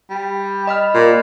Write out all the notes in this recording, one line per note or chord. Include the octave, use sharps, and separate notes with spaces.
G3
D#5 B5 F6
A#2